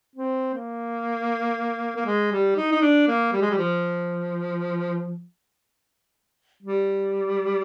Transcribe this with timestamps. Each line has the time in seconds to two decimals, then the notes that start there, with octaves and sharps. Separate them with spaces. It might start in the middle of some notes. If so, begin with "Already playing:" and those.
0.16 C4
0.54 A#3
1.96 A#3
2.06 G#3
2.32 G3
2.57 D#4
2.72 D#4
2.82 D4
3.08 A#3
3.33 G3
3.42 G#3
3.50 G3
3.58 F3
6.63 G3